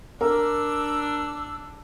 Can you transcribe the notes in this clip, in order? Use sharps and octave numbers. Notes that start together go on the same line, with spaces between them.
D4 A#4 D6 E6